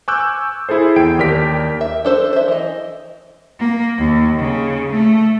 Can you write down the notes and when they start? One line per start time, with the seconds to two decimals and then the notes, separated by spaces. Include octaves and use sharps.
0.08 G#5 C#6 D6 E6 F#6 G6
0.69 E4 G#4 A4 C5
0.96 E2 G5 D7
1.19 D#2 G4 A#4 D5 B6
1.81 E5
2.05 D4 A4 C5
2.33 C5 E5
2.48 E3 D#5
3.59 A#3
3.98 D#2
4.38 C#3
4.92 A3